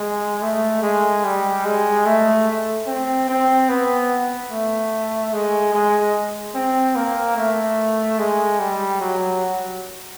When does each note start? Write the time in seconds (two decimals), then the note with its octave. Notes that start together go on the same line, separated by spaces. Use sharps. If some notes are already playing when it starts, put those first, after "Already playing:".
Already playing: G#3
0.42 A3
0.82 G#3
1.24 G3
1.65 G#3
2.06 A3
2.87 C4
3.29 C4
3.69 B3
4.51 A3
5.33 G#3
5.73 G#3
6.55 C4
6.95 A#3
7.37 A3
8.19 G#3
8.59 G3
9.00 F#3